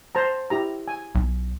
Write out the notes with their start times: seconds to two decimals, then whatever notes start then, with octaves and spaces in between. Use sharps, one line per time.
0.15 C5 A5 A#5
0.50 E4 G4 A#5
0.88 G#5
1.15 B1